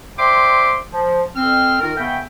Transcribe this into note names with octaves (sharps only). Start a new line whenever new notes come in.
C5 D5 E5 G5 C6 D6
F3
F2 C4 F6
D#3 D#4 F4 A#4
C#3 B3 E5 G5